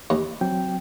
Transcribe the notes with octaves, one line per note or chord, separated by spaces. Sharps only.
D#2
F#3 C4 G5